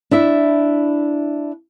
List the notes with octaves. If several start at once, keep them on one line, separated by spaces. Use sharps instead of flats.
D4 E4 E5